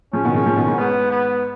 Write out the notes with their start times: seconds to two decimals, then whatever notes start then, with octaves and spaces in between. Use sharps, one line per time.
0.13 C#3 F3 C#4
0.25 B2 D#3
0.35 C#3 F3
0.46 C#3 F3
0.56 B2 D#3
0.68 G#2
0.78 G#2 B3
1.11 B3